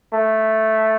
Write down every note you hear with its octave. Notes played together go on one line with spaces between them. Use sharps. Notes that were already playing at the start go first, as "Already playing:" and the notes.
A3